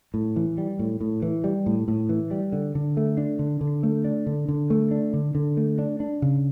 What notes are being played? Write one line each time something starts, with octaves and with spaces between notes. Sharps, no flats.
A2
E3
G3
A2
A2
E3
G3
A2
A2
E3
G3
D3
D3
A3
D4
D3
D3
A3
D4
D3
D3
A3
D4
D3
D3
A3
D4
D4
C#3